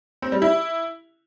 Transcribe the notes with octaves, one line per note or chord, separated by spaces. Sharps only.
C4
G3
E4